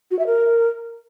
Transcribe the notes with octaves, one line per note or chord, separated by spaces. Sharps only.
F#4
E5
A#4